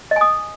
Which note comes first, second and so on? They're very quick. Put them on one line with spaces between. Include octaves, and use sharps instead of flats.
D#5 G#5 D#6